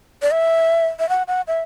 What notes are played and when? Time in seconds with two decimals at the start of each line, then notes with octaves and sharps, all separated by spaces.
0.22 D5
0.31 E5
0.99 E5
1.09 F#5
1.28 F#5
1.48 E5